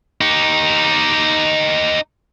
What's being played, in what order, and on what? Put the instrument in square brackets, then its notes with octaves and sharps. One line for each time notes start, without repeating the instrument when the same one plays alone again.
[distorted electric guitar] D#4 G4